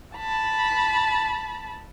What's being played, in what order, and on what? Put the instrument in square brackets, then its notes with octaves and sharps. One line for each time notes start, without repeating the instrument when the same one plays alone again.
[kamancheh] A5 B5